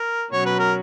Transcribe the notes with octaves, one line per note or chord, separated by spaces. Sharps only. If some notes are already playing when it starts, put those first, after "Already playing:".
Already playing: A#4
B2 F#3 C#4 F#4 C#5
B4
A#4